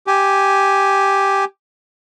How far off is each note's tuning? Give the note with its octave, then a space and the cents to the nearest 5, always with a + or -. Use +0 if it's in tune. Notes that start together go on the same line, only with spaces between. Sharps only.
G4 +0 G#5 +0